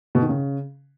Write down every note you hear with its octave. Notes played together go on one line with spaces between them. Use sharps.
B2
D#3
C#3